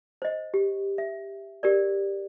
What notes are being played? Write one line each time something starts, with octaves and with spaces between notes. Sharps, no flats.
C5 D#5
G4
E5
G4 A#4 D5